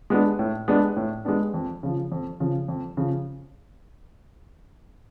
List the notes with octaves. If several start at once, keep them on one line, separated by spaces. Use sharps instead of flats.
G#3 B3 D4
A2
G#3 B3 D4
A2
G#3 B3 D4
F2
C#3 F3
F2
C#3 F3
F2
C#3 F3